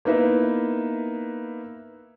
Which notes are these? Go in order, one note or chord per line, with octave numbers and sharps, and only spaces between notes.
A#3 B3 D#4 E4 B4 E5